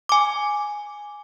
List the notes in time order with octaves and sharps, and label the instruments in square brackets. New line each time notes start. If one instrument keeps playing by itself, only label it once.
[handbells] G#5 D6